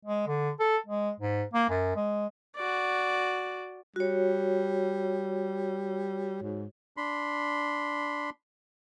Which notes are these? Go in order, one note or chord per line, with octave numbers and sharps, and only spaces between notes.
G#3
D3
A4
G#3
G#2
A#3
F#2
G#3
F#4 D5
G3 F#4 C#5
G#2
D4 B5 C6